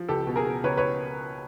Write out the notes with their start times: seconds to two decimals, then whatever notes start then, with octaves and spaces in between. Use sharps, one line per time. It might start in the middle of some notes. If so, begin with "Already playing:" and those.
Already playing: F3
0.09 C#2 G4 A4
0.27 B2
0.36 G#4 A#4
0.46 B2
0.64 C#2 B4 C#5
0.77 B4 C#5